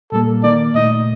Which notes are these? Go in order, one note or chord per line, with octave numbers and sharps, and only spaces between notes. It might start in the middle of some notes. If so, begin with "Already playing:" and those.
A#2 G3 A#3 A4
D#3 A#3 D#4 D5
A#2 A3 D#4 D#5